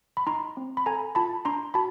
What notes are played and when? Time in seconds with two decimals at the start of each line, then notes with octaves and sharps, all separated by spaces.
0.17 B5
0.27 D#4 A#5 C6
0.57 C4
0.77 B5
0.86 A4 G#5 A#5
1.15 F4 A5 B5
1.45 D4 A#5 C6
1.74 F#4 A5 B5